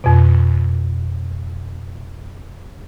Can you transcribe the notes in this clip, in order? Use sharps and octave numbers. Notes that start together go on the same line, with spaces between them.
F2 B2